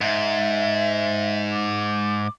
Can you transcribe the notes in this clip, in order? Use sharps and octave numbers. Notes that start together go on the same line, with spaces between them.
G#2 E5
D6